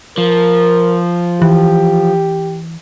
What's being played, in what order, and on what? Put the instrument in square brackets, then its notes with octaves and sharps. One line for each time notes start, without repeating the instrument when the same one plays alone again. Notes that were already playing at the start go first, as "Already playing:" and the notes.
[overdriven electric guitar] F3 [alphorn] A#4
[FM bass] E3 [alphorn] G4